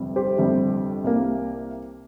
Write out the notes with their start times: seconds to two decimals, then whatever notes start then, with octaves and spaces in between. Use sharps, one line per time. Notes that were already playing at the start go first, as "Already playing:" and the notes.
Already playing: G1 F2 C3 G3
0.16 G4 C5
0.39 G1 F2 C3 G3
1.04 C2 C3 A#3